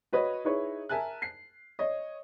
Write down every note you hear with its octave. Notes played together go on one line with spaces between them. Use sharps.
F#4 B4 C#5 D#5
D#4 E4 G#4 B4 C#5 C#6
A#4 E5 G#5 A5 F#6
C7
C#5 D#5